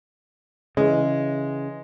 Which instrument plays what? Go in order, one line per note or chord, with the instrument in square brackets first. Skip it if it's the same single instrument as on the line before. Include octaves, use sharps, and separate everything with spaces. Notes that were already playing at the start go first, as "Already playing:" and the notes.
[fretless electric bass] C#3 E3 [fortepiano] G#3